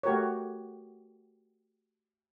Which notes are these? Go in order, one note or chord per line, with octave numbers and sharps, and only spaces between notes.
A3 F#4 G4 A#4 C#5